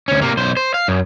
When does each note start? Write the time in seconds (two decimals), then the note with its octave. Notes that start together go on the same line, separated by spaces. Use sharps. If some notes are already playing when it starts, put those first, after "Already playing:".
0.08 D2 C#4
0.22 C3 A#3
0.37 B1 C5
0.57 C5
0.74 F5
0.88 F#2